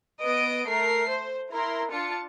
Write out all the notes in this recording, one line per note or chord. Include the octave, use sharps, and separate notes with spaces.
B3 D#5 D7
A3 A#4 C7
C5
E4 A#4 A#5 C6
D4 F4 A5 C#7